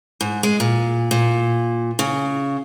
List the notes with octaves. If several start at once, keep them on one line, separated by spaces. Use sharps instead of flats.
G#2
G#3
A#2
A#2
C#3